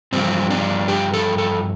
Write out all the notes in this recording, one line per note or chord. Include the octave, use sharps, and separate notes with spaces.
G2 F3 C4
D4
G4
A4
A4